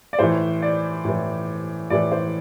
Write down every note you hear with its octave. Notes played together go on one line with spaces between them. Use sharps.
D5
A2 E3 C5
D5
A2 E3
A2 E3 D5
C5